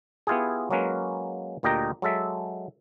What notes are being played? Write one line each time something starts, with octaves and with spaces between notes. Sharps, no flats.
B3 E4 F4 G4 G#4
F#3 G#3 A#3 C#4 B4
D2 A#2 G4 D#5 G5 A#5
F#3 G#3 A4 E5